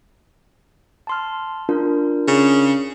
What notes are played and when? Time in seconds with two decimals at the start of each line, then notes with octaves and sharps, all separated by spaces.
1.07 A5 C6 F6
1.69 D4 F4 A#4
2.28 C#3